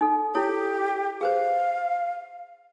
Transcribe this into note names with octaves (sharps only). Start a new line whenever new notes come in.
D#4 A4
E4 G4 A4 C#5
G#4 B4 C5 F5